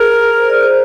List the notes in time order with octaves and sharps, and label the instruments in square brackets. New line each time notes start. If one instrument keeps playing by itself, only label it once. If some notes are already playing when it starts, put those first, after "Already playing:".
Already playing: [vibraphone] G#4 [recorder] A#4
[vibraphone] C5
D5
C5